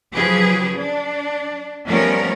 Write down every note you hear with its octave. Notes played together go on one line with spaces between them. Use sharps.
C#3 F3 F#3 G4 G#4 B4
D4
F3 G3 A3 B3 C#4 A#4